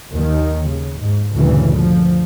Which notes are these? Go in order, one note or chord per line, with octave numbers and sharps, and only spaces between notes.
D#2 D#3
C#3
G#2
D2 G2 A#2 C#3 E3
F3